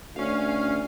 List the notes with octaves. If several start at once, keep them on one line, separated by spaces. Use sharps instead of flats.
D2 C#4 F5